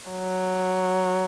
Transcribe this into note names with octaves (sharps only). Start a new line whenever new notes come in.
F#3